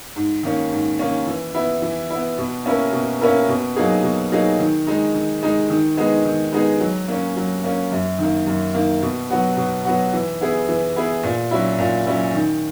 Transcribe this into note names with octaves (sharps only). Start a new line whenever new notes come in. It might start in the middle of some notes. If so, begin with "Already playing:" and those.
G#2
D#3 A#3 C#4
G#2
D#3 A#3 C#4
E3
B3 E4
E3
B3 E4
B2
A#3 C#4 E4 A#4
B2
A#3 C#4 E4 A#4
B2
F#3 A#3 D#4 G#4
B2
F#3 A#3 D#4 G#4
D#3
G#3 D#4
D#3
G#3 D#4
D#3
G#3 B3 D#4 G#4
D#3
G#3 B3 D#4 G#4
F#3
A#3 C#4
F#3
A#3 C#4
F#2
D#3 A#3
F#2
D#3 A#3
B2
F#3 B3 F#4
B2
F#3 B3 F#4
E3
B3 E4 G#4
E3
B3 E4 G#4
A#2
F#3 C#4 E4
A#2
F#3 C#4 E4
D#3